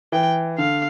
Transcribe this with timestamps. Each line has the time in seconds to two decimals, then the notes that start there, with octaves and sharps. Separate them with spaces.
0.12 E3 G5
0.58 D3 F5